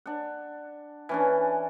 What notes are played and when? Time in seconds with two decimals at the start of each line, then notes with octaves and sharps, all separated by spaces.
0.06 D4 F#5
1.09 E3 C#4 D4